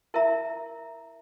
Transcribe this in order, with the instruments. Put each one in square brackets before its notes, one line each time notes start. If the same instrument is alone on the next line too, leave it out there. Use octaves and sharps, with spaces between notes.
[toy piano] E4 A#4 E5 A#5